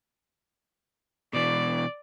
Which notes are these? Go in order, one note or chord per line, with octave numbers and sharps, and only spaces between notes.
B2 E3 D5